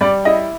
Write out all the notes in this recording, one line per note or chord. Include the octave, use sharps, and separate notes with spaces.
G3 D5
E4 D#5